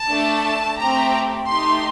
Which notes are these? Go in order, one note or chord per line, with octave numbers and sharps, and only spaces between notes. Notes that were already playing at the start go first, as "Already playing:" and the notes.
Already playing: A5
A3 D4 A4
A3 C4 G4 A#5
A3 D#4 G4 C6